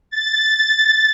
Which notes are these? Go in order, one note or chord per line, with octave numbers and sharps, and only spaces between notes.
A6